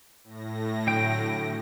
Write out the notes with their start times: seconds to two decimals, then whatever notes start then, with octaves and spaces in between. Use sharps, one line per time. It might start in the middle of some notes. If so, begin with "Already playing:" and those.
0.24 A2 A#6
0.87 D3 F#3 G5